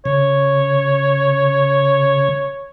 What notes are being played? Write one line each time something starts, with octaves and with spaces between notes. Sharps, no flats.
C#3 C#5